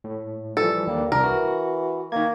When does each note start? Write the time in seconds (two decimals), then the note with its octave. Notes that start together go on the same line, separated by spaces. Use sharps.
0.04 A2
0.57 E3 F3 G3 A4
0.87 D#2 G3 A#3 D4
1.12 C2 D4 A#4
1.24 E3 F#4
2.12 D#3 A#3 G#6